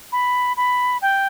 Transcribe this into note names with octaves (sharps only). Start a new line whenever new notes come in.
B5
B5
G5